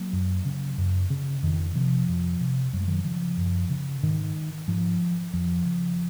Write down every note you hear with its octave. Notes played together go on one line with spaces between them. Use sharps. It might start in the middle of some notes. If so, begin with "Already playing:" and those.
Already playing: F#3 A#3
F#2
C#3
F#2
C#3
F2 D#3
C3 F3
F2
C3
F#2 F#3
G#3
D#3 F#3
C#3 F3
F#2
C#3
G#2 D#3
G#2 F3
F2 F3
C#3